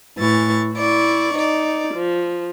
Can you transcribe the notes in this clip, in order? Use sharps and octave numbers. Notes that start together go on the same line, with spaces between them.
A2 E3 C#6 A6
E4 D5 C#6
D#4 D5
F3